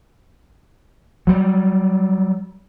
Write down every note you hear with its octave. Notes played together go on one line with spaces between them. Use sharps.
F#3 G3